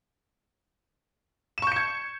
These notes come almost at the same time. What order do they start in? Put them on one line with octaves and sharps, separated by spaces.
E7 C#6 G6 C#7 G#6